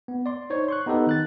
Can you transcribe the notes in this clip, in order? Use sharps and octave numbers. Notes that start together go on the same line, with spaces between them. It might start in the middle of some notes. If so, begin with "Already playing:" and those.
B3
D5 C6
D#4 C5 C#5
C6 C#6 F#6
B3 D#4 G4 A4 B4
D#3 F#6 A6